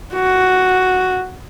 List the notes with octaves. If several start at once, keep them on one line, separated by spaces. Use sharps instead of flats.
F#4